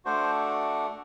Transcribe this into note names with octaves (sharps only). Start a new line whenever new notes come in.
A3 D4 F#4 C5